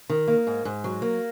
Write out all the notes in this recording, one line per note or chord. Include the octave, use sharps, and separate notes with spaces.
D#3
A#3
G#2
G#2
F#3
A#3